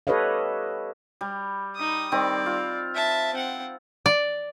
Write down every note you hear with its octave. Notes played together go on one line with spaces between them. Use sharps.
G4 A4 B4 C#5 D#5 F5
G3
D#4 D#6
D#3 G3 C4 D5
F4
E5 A5
C4 F#5
D5